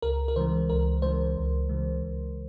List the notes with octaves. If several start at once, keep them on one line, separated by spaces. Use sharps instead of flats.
C#2 A#4
A#4
C#3 E3 G#3 C5
C#2 A#4
C#3 E3 G#3 C5
C#2
C#3 E3 G#3
C#2